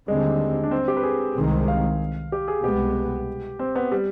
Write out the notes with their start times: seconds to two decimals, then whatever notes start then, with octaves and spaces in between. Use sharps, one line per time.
0.08 D#2 D3 G3 G#3 C4
0.64 D4
0.71 C4
0.88 G4
0.97 B4
1.03 G#4
1.36 C2 C3 D#3 G#3 C4
1.68 F5
2.32 G4
2.48 G#4
2.64 C2 B2 G#3 B3 G4
3.59 C4
3.76 B3
3.92 G3